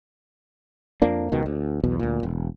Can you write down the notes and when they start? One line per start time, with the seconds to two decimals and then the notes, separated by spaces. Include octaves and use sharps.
1.02 F2 F3 A#3 D4
1.32 C#2 B2 D#3
1.46 D2
1.84 B1 E2 B2
1.99 D2 A#2
2.23 E1